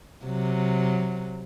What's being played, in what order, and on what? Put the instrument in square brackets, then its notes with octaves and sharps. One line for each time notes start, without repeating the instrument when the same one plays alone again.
[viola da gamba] C3 F#3